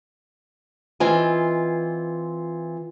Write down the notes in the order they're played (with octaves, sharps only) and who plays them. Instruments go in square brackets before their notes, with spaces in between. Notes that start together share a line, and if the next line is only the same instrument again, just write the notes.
[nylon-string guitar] E3 C4 F4 D#5 G#5